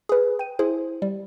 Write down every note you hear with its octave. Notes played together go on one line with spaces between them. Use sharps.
G#4 B4
G5 D#7
E4 G#4 C5
G3